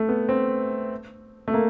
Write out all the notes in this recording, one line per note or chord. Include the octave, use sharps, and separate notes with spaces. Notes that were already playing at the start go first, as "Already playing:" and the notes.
Already playing: A3
B3
C4
A3
A#3